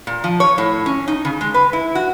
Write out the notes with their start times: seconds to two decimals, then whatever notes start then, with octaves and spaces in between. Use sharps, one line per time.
0.07 A#2
0.24 F3
0.40 C#5
0.58 A2
0.86 C#4
1.08 D#4
1.25 C#3
1.41 G#3
1.54 B4
1.73 E4
1.95 F#4